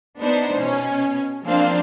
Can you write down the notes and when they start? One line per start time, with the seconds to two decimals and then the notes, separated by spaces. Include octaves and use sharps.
0.20 B3 D4 D#4 C5
0.59 B2 C#4
1.44 F3 A#3 C4 D4 C5 F5